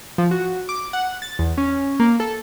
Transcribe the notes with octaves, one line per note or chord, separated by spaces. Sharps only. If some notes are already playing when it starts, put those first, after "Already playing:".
F3
F#4
D6
F#5
A6
E2
C#4
A#3
A4